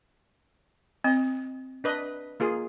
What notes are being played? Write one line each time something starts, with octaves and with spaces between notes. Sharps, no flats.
C4 D#5
D4 B4 D#5
A#3 F4 G#4